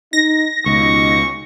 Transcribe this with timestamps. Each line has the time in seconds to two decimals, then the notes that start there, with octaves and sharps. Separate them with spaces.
0.13 D#4 A#6
0.66 C#2 B2 D#4 C#6